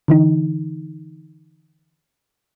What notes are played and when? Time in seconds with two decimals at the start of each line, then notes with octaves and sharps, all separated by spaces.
0.08 D3 E3 D#4